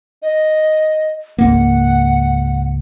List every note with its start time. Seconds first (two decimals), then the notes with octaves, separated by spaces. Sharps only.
0.22 D#5
1.38 C#2 G#2 A#3 F#5